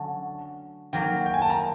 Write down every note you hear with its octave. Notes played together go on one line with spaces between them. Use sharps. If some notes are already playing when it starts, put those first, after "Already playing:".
Already playing: D3 F#3 A3 C#4
D#3 F#3 A#3 G5
G5
G#5
A5
A#5